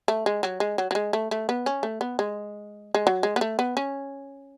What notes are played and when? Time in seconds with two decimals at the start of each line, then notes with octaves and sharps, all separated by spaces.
0.08 A3
0.26 G#3
0.43 F#3
0.60 G#3
0.78 F#3
0.91 F#3
0.95 G#3
1.13 A3
1.31 A3
1.49 B3
1.66 C#4
1.83 A3
2.01 B3
2.19 G#3
2.95 G#3
3.07 F#3
3.23 G#3
3.36 B3
3.41 A3
3.59 B3
3.77 C#4